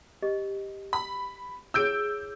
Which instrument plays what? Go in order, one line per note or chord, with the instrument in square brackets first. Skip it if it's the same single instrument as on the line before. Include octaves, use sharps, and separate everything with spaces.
[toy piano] G4 D#5
[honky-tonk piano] B5 [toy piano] E6
[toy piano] E4 G#4 C#5 [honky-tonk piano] E6 G6 D7